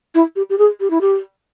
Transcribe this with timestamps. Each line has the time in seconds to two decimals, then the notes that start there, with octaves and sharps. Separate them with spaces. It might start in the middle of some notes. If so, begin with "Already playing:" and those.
0.14 E4
0.36 G4
0.50 G4
0.58 G#4
0.80 G4
0.90 E4
1.01 G4